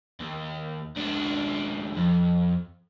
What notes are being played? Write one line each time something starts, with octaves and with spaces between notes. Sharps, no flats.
D#2
C#2 D4
F2